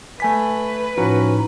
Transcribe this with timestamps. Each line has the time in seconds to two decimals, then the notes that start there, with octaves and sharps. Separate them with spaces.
0.20 A3 B4 G#5 B6
0.97 A2 F3 C#4 D#4 F#4